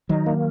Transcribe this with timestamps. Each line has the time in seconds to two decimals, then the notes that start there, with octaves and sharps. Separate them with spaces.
0.09 D#3 F#3 D#4
0.26 A#3